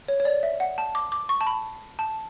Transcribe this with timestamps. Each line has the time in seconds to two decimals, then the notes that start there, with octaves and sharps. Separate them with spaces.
0.08 C#5
0.20 C#5
0.25 D5
0.43 E5
0.60 F#5
0.78 A5
0.95 D6
1.12 D6
1.29 C#6
1.41 A5
1.47 B5
1.99 A5